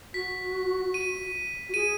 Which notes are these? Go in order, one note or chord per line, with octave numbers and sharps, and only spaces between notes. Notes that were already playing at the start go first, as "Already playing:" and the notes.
F#4 B6
D#7
F#4
G#4 D#7